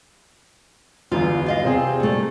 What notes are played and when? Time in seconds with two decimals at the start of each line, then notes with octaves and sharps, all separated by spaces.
1.12 G1 E2 F4
1.46 F4 D#5 F5
1.64 C3 C4 G#4
2.00 A#2 A3